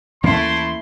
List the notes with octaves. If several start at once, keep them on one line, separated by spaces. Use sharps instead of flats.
D#2 E3 A3 A#3 C#4 E4 C6